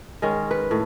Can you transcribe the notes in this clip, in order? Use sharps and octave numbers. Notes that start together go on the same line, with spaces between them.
D#3 G#3 C#4
B4
A2